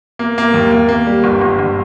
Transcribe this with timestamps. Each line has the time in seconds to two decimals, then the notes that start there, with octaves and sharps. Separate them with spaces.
0.19 A#3
0.38 A#3
0.54 D#2
0.72 A#3
0.89 A#3
1.07 G3
1.24 G1
1.41 G1
1.59 G1